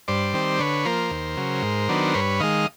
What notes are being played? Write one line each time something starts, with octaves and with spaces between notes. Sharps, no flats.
G2 C5 D5
D#3 G3 C4
D3 B4 C#5
F3 A#3 A#4 C5
D#2
C#3 F#3
G#2
D#3 F#3 B3 D4
G2 B4 C#5
D#3 G#3 D#5 F5